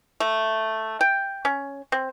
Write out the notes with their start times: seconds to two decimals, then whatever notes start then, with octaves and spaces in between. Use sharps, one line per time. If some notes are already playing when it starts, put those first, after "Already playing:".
0.20 A3
1.01 G5
1.45 C#4
1.92 C4